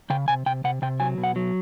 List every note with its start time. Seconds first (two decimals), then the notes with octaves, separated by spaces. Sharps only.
0.10 C#3 G5
0.28 C3 G#5
0.46 C3 G5
0.64 C3 F#5
0.82 C3 G5
1.00 F#3 G#5
1.18 B2
1.23 F#5
1.36 F#3